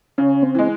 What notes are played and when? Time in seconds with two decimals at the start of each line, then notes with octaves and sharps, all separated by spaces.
0.18 C#3 C#4
0.43 C4
0.55 E3 G#3